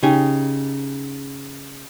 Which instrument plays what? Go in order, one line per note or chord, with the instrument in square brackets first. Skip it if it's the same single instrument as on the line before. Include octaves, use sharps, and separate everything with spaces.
[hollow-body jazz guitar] C#3 D#4 G4 G#5